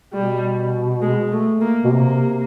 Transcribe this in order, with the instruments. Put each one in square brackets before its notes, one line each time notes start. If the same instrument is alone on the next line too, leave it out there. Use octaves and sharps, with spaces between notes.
[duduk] B2 [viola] G3
[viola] G#3
A3
A#3
[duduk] B2
[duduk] C3 [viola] A#3